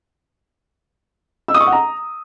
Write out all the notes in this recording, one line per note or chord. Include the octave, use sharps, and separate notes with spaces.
E6
D#6
C#6
F#5
A#5